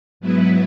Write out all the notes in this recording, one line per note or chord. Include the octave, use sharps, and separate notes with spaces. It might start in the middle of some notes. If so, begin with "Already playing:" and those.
G#2 F#3 B3 E4 B4